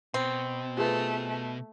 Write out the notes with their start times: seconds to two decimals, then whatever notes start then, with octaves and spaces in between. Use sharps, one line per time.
0.14 B2 C4
0.77 A3 F4 G#4 B4